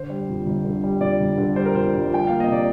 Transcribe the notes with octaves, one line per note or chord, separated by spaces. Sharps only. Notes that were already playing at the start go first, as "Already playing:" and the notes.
Already playing: D3 C5
G3
F2
G1
D3
G3
F2 D5
G1
D3
G3 C5
A#4
F2 C5
G1
F3 G5
A#3 F5
D#5
C3
D5